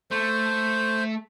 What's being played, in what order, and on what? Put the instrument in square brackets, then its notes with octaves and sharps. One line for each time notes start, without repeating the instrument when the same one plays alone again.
[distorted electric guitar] A3 [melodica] C5